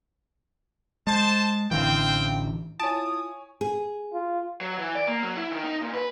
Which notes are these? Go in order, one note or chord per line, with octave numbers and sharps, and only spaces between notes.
G#3 C5 A5
A1 D3 E3 C4 F5 G5
E4 F4 C#5 G#5 A5 D#6 D7
G#4
F4
F#3
E3
D5
A#3
F#3
E4
D#3
D#4
A#2
B4